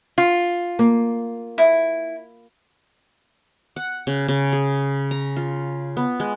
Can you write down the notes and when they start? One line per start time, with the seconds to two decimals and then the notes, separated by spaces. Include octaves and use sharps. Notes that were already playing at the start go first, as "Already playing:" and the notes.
0.18 F4
0.79 A#3
1.58 E4
3.76 F#5
4.07 C#3
4.28 C#3
4.53 G#4
5.11 A#5
5.37 F4
5.97 B3
6.20 G#3